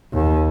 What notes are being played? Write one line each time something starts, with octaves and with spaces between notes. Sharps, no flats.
D#2